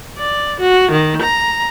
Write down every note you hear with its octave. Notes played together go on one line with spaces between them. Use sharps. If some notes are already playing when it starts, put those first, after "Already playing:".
D5
F#4
D#3
A#5